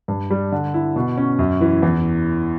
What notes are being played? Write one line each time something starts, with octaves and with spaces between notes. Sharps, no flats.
G2
G3
D3
E4
B2
C#4
F#2
E3
E2